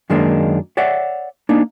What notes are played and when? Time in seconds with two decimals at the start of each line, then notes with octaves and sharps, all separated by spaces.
0.10 F#2 D#3 G#3 A#3 D4 D#4
0.77 C#5 D5 E5 F#5
1.49 A#3 D4 D#4